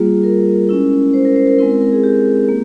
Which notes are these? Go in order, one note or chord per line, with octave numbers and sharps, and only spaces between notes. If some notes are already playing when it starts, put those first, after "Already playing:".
Already playing: G3 A#3 F4 G#4
A#4
G#3 C#4 E4
C5
A#4
C5
A#4
G#3 C4 E4 A#4
A#4
A#4
G#4
G4
A#3